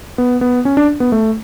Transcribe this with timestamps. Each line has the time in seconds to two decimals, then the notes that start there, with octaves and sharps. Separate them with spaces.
0.18 B3
0.41 B3
0.65 C#4
0.77 D4
1.00 B3
1.12 A3